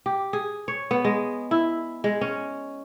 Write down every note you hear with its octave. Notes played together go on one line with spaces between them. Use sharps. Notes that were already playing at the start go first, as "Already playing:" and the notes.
G4
G#4
C#5
B3
G#3
E4
G#3
C#4